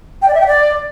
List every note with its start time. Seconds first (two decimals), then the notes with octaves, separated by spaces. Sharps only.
0.22 G5
0.28 D5
0.34 E5
0.41 G5
0.47 D5